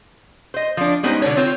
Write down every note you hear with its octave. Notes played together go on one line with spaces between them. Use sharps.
C5 D#5
F3 D4
G3 G#3 B3 C#4 D#4 C5
B2 D3 B3 D4 C#5
C4 F4 C5 C#5